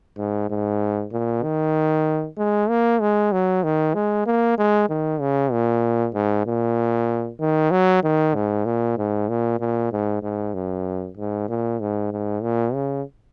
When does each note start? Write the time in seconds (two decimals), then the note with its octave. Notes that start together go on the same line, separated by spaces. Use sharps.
0.17 G#2
0.50 G#2
1.12 A#2
1.43 D#3
2.37 G#3
2.69 A#3
3.01 G#3
3.32 F#3
3.64 D#3
3.94 G#3
4.26 A#3
4.58 G#3
4.89 D#3
5.20 C#3
5.52 A#2
6.14 G#2
6.46 A#2
7.40 D#3
7.71 F#3
8.04 D#3
8.35 G#2
8.66 A#2
8.98 G#2
9.29 A#2
9.60 A#2
9.92 G#2
10.23 G#2
10.54 F#2
11.17 G#2
11.49 A#2
11.80 G#2
12.12 G#2
12.42 A#2
12.74 C#3